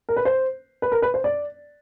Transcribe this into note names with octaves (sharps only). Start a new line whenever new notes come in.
A#4
B4
C5
B4
A#4
B4
C5
D5